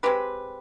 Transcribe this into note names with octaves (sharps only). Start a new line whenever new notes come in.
G#3 C4 G4 B4